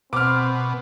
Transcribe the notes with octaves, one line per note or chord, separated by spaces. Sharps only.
B2 C4 D6 F6